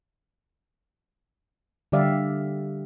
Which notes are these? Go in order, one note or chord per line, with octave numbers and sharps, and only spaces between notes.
D3 G3 G4 D5 E5 F5